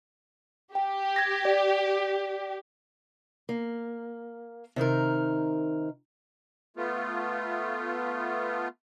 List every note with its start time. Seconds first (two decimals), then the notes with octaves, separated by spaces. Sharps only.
0.75 G4 G5
1.16 G#6 A#6
1.45 D5
3.49 A#3
4.76 C3 D#3 D#4 A#4
6.77 A3 B3 F4